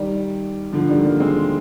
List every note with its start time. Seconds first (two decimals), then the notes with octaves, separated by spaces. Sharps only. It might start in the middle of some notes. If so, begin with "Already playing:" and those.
Already playing: D#3 G3
0.72 D3 F3
0.89 D#3 G3
1.04 G3 A#3
1.20 G#3 C4